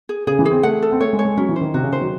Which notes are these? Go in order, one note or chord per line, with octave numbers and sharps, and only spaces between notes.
G#4
C#3 G#4
E3
G#4
C4
A3 F#5
A4
C4
A3 C#5
G#3
C#5
G#3
F#3 C#4
E3
C5
D#3
C3 F#4
C#3
D#3 C5
F#3